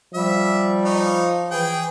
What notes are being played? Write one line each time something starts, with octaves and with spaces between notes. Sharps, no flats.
F3 G3 E5
D#4 C#5
E3 G#4 G5